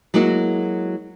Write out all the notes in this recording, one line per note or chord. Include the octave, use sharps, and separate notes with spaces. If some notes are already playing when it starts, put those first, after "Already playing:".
F#3 G#3 A#3 E4 F#4